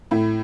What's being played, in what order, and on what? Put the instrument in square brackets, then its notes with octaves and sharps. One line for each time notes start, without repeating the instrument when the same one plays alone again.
[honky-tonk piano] A2 E4